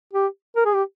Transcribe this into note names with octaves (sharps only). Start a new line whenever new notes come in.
G4
A#4
G#4
G4